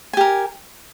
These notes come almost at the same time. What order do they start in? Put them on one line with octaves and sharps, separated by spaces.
G#5 G4 A#4